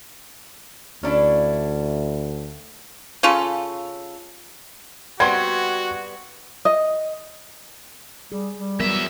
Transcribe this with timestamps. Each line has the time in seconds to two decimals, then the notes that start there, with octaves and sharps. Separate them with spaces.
1.03 D2 C#4 D4 E4
3.23 C#3 C#4 F4 A4
5.20 G3 B3 C4 F#4 C6 G#6
6.65 D#5
8.32 G3 G#4
8.58 G3
8.80 E2 F#3 B3 A#4 E5